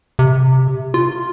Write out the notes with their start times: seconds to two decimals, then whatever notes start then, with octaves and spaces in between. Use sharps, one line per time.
0.19 C3
0.94 F4